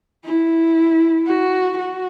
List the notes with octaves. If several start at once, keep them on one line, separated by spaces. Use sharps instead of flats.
E4
F#4
F#4